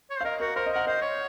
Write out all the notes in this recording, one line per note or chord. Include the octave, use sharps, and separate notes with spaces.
C#5
C5
F5
A#4 D#5
F#4 A#4
A#4 C5
D#5
A#4 F#5
C5 D#5
C#5